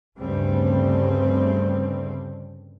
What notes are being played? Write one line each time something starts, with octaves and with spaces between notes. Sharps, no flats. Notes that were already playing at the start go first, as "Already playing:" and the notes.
D2 G2 C#3 G3 A3 C4